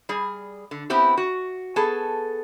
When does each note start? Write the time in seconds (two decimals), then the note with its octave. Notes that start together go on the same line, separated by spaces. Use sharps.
0.09 G3 G#4
0.71 D3
0.90 B3 C4 E4 G4
1.17 F#4
1.76 B3 G#4 A4 A5